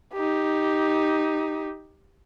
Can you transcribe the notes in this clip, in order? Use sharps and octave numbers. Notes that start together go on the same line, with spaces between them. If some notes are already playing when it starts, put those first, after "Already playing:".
D#4 G4